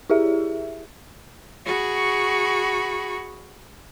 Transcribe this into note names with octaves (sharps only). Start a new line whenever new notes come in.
E4 G4 G#4 E5
F#4 G#4 B5 C#6